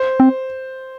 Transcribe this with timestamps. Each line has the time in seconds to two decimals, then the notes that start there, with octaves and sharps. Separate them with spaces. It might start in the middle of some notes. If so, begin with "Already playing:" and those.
Already playing: C5
0.20 C4